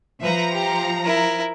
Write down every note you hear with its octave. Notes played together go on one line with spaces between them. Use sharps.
F3 B4 E5 A#5
G4
E4 A#4